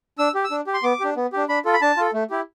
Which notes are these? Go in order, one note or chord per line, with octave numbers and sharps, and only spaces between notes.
D4 E6
G4
E6
D4
G4
C6
B3 D6
D4 G4
B3
D4 G4
D4 B5
F4 A4
B5
D4 A5
F4 A4
A3
E4 G4